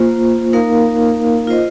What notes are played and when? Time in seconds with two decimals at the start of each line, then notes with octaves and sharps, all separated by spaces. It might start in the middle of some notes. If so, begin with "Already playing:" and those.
Already playing: A#3 F4 C5
0.53 A#3 D#4 A#4 F5
1.47 F4 C5 D#5